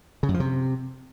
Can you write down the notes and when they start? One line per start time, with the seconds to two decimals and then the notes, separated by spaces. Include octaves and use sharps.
0.23 C#3
0.29 F#2
0.34 F3
0.40 C3